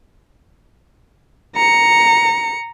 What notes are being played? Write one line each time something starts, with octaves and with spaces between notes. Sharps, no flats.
A#5 C#7